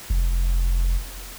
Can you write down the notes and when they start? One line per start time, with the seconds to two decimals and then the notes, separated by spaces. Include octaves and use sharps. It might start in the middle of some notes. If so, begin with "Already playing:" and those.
0.10 F1